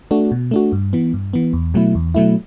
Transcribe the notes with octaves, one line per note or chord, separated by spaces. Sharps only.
A3 D4 F#4
B2
A3 D4 F#4
G2
E3 B3
G2
E3 B3
E2
B2 F#3 A3 E4
E2
B2 F#3 A3 E4